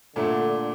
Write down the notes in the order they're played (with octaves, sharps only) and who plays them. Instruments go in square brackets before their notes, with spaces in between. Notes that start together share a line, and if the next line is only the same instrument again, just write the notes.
[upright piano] A#2 A3 D4 [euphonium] D3